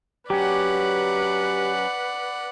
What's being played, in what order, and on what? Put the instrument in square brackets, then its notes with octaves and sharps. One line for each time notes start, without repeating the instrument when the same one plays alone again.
[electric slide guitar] F#3 C#4 [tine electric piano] G4 [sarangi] B4 [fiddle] D5 F#5